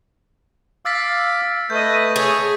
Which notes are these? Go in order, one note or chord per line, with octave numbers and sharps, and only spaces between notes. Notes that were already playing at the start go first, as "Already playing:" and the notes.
F5 D6 E6 A6 B6
A3 B4 D#5 G6
G#4 C#5